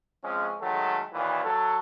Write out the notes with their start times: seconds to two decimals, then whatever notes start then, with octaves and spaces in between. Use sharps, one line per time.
0.23 F3 G#3 C4 C#4
0.61 D#3 F#3 G#3 A3 A4
1.12 D#2 A#2 D#3 E3
1.44 F#3 A4